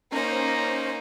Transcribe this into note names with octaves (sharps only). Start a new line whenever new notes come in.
A#3 C#4 D#4 C5